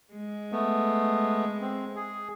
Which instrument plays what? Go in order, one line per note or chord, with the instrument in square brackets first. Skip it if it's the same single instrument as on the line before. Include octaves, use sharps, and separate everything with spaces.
[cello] G#3
[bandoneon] A3 B3
C4
G#4